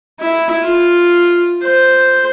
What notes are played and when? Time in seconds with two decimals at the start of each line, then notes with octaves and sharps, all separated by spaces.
0.20 E4
0.63 F4
1.62 C5